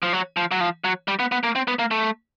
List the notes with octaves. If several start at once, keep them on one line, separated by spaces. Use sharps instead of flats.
F3
F#3
F3
F#3
F3
F#3
G3
B3
B3
A#3
C4
B3
A#3
A3